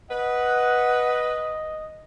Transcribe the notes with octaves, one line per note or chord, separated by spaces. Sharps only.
B4 D#5 F#5